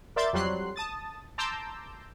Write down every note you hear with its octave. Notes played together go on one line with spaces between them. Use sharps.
A#4 D5 E5 C6 G6 A6
F2 F#3 G3 C6 F#6 C7
A5 D#6 A6
A5 A#5 C6 D6 E6 G6